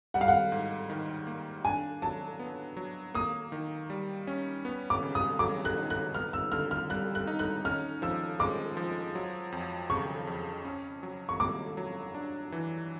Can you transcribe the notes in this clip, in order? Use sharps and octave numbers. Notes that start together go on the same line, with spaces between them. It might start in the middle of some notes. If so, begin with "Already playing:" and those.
G3 F#5
F5
F#5
G#2
D#3
A#3
D4 G#5
F#3 A5
B3
F#3
A#3 D#6
D#3
G3
C#4
B3
D6
C#3
D#6
F#3 D6
F#6
D#4
F#6
B3 F6
E6
D3 F6
F6
G3 F#6
F#6
D#4
F#6
C#4 F6
F3 E6
G#3 D6
F3
F#3
F2
C#3 C#6
F2
C#4
F#3
C#6
A#3 D6
F#3
D4
E3